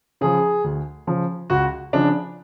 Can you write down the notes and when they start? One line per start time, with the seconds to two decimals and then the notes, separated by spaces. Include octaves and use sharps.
0.21 C#3 F3 G#4
0.64 D2
1.07 C#3 F3
1.50 C#2 F#4
1.93 C#3 F3 D4